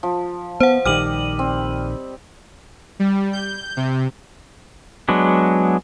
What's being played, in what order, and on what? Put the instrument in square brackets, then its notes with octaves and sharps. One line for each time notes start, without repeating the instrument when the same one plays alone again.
[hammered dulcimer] F3
[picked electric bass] B3 [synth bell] C5 F#5
[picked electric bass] A#1 D#3 [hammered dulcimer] G3 D5 D#5 [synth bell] F6 D#7 F#7
[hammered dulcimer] C4
[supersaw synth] G3
G6
C3
[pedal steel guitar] F#3 G#3 B3 D4